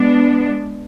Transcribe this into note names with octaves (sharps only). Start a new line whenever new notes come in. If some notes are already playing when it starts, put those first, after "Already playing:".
Already playing: G#3 B3 D4